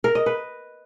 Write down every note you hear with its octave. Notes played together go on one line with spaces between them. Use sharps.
A#4
D#5
B4